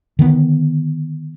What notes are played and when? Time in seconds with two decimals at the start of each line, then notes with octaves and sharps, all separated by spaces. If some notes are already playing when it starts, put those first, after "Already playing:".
0.19 D3 D#3 B3